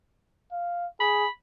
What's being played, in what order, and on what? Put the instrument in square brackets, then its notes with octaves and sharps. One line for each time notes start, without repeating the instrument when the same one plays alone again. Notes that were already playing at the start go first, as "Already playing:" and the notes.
[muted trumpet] F5
[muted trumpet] G#4 [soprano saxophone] B5